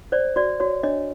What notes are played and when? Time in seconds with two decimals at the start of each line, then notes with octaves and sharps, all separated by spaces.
0.12 C5 D5
0.36 F#4 D5
0.60 F#4 C#5
0.83 D4 C#5 D#5